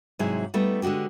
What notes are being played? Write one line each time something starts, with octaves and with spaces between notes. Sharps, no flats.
G#2 C3 F#3 E4 G#4
G3 A3 B3 D#4
D3 G#3 D4 F#4 G4